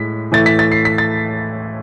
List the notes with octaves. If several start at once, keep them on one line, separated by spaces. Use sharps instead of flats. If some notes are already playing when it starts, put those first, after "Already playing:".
Already playing: A2 G#3 B6
A2 E3 A3 A6
B6
A6
C7
B6
A6